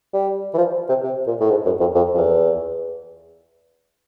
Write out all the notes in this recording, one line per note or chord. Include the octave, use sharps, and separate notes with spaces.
G3
E3
F3
C3
C3
A#2
A2
G#2
F#2
F2
F2
F2
E2